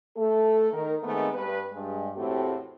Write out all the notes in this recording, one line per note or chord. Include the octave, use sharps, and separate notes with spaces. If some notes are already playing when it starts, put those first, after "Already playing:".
A3 A4
D#3 A#4
D#3 G#3 A3 B3 C4
G2 B4
G2 G#3
E2 A2 A3 C4 F#4 G4